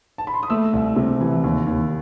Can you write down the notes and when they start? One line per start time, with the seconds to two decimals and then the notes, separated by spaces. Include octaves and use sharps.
0.18 A5
0.27 B5
0.34 C6
0.43 D#6
0.50 A3 E6
0.73 C2
0.96 C3
1.20 E3
1.44 D#2
1.67 D#2